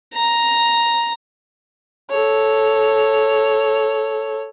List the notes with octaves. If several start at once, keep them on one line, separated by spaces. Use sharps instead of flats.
A#5
A4 C#5